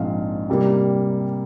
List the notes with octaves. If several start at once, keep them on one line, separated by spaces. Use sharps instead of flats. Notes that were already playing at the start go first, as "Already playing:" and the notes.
Already playing: A#1 G#2 F3 C4 F5
C2 C3 G3 A#3